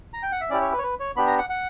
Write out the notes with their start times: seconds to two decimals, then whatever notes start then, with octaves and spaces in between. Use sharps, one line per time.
0.14 A#5
0.23 G5
0.32 F#5
0.41 E5
0.50 C#4 E4 G4 D5
0.61 C#5
0.72 B4
0.79 C#5
0.83 B4
1.00 C#5
1.16 B3 D4 G4 B5
1.27 A#5
1.38 F#5
1.50 F#5